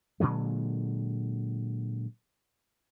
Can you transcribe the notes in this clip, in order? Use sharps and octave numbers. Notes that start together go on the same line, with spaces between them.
A#2 D3 F#3 G#3